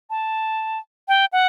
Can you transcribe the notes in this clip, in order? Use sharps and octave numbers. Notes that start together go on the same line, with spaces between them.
A5
G5
F#5